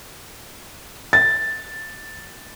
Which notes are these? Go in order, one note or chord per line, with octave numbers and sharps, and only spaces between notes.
A6